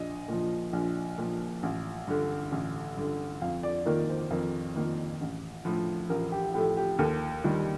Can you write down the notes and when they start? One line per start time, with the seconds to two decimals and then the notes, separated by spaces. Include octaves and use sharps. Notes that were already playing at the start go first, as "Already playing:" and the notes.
Already playing: A#1 D#5
0.28 A#2 F3
0.73 A#1
1.18 A#2 F3
1.63 A1
2.08 G2 D3
2.52 A1
2.97 G2 D3
3.42 F2 F5
3.63 D5
3.86 D#3 A#3 A#4
4.09 C5
4.31 F2 A#4
4.76 D#3 A#3
5.21 A1
5.65 A2 F3 A3
6.10 A1 A#4
6.32 G4
6.54 A2 F3 A3 G4
6.77 G4
6.99 D#2 A4
7.44 D#3 G3